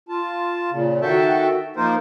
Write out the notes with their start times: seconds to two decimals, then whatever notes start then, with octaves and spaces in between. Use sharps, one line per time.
0.09 F4 A5
0.71 A#2 C#3
1.02 D#3 F#4 A4 E5 G5 A5
1.76 F3 A#3 D#4 F4 A#4 C5